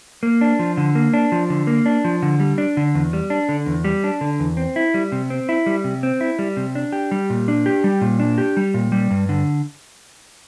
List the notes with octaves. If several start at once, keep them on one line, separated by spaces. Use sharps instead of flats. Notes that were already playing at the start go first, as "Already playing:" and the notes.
A#3
D4
F3
D3
A#3
D4
F3
D3
A#3
D4
F3
D3
G3
D4
D3
E2
G3
D4
D3
E2
G3
D4
D3
E2
C4
E4
G3
C3
C4
E4
G3
C3
C4
E4
G3
C3
D4
G4
G3
A#2
D4
G4
G3
A#2
D4
G4
G3
A#2
G3
G2
D3